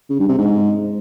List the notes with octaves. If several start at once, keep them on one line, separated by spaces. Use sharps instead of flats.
C#3
G2
C3
G#2